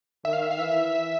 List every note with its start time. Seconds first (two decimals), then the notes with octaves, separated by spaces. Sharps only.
0.25 D#3 E5
0.33 F5
0.43 E5
0.51 F5
0.59 E3 E5